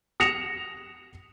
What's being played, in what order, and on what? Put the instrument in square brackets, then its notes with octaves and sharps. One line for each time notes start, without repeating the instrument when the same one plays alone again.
[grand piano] D#6 A#6 C#7 E7 F7